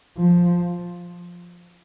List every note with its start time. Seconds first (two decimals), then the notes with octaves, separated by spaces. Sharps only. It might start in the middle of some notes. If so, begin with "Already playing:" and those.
0.18 F3